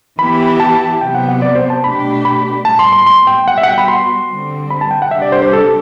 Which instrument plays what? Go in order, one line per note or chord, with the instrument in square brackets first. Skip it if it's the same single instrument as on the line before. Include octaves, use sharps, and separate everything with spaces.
[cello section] E3 B3 E4 G4 [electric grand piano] B5
[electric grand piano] A5
[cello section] C3 F#3 B3 [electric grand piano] G5
[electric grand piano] F#5
F#5
D5
C5
A5
[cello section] B2 A3 D4 G4 [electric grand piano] B5
[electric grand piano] B5
[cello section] A2 G3 B3 [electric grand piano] A5
[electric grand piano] C6
C6
C6
G5
[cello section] G3 B3 F#4 [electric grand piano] F#5
[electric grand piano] E5
F#5
G5
B5
C6
[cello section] D3 G3 C4
[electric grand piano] B5
A5
G5
F#5
[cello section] C3 G3 D4 G4 [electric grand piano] E5
[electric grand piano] D5
C5
C5
A4